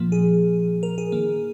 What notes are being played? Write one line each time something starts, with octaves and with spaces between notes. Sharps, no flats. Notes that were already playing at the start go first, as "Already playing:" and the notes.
Already playing: A#2 F3 A#3
G#4
A#4
G#4
D#3 A#3